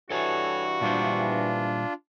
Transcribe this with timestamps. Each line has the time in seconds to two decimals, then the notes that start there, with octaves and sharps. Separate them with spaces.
0.10 G2 E3 F#4 A4 C#5 G#5 A5
0.81 A#2 G3 D4 F4 C5